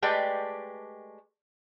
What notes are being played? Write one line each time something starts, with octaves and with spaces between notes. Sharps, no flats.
G#3 A3 G4 B4 D5 G5